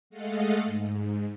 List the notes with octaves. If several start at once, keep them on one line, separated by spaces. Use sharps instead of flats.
G#3 A3 A4 D#5 F5 F#5
G#2